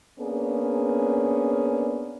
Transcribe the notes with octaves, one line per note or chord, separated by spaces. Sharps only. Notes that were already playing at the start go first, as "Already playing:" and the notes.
A#3 B3 C#4 D4 G#4